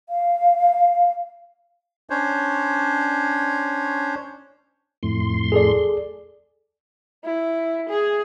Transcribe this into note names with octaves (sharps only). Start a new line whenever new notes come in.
F5
C#4 D4 C5 C#5
F2 A2 C6
G#4 A4 D5
E4
G#4